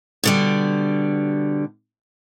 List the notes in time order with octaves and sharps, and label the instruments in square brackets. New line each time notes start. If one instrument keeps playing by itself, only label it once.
[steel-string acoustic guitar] B2 D3 G3